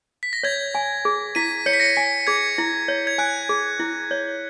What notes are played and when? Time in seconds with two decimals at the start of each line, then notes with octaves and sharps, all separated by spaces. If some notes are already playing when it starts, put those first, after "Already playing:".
0.23 B6
0.33 A#6
0.43 C#5 G#6
0.75 G#5
1.05 G#4
1.35 E4 B6 D#7
1.66 C#5 C#7
1.73 B6
1.80 A#6 C#7
1.96 G#5 B6
2.27 G#4 G#6
2.58 E4
2.88 C#5
3.07 G#6
3.18 G#5 F#6
3.49 G#4
3.80 E4
4.11 C#5